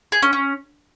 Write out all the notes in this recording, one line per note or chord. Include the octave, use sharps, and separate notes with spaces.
G#4
C#4
C#4